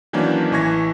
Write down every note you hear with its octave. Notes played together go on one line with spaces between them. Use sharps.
D#3 E3 F#3 A#3 C#4 D4
A1 E3 G#5 C#6 G#6 A#6